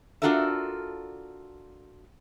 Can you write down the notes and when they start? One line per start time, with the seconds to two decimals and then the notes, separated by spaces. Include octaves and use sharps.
0.22 D4 F4 F#4 A4 A#4 E5